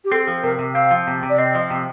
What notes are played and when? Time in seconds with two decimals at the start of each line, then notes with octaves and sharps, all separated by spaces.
0.05 G4
0.12 C4 A4
0.27 F3
0.43 C3 A#4
0.59 C3
0.74 C4 F5
0.91 F3
1.07 C3
1.23 C3
1.30 D5
1.38 C4 D#5
1.55 F3
1.70 C3